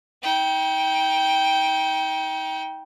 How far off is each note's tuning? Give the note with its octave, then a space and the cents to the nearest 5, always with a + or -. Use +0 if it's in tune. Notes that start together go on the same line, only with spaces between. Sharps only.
D#4 +45 G5 +0